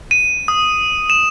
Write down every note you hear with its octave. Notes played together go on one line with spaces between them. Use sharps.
D#7
D#6
E7